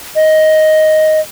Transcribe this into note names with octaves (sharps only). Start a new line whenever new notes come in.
D#5